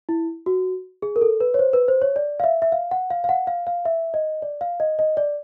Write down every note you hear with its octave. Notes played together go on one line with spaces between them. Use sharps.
E4
F#4
G#4
A#4
A4
B4
C#5
C5
B4
C5
C#5
D5
F5
E5
E5
F5
F#5
F5
F5
F#5
F5
F5
E5
D#5
D5
F5
D#5
D#5
D5